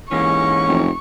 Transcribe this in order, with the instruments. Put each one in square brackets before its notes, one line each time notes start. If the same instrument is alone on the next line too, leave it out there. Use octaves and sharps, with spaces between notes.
[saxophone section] G#2 C#4 [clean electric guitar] E3 A#3 [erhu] C#6
[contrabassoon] F1